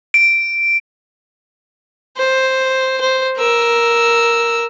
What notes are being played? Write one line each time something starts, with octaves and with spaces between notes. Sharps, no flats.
D7
C5
C5
A#4 E6